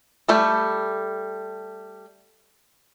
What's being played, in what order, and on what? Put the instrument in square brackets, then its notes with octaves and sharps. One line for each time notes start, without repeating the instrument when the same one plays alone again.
[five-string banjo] G3 A3 A4